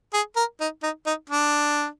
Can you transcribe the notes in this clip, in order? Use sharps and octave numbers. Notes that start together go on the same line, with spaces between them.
G#4
A#4
D#4
D#4
D#4
D4